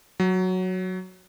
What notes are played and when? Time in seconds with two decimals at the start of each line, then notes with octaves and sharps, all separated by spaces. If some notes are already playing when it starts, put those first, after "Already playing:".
0.20 F#3